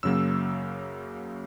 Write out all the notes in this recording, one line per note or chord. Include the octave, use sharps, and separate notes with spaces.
F#2 C#3 F#3 A#3 E6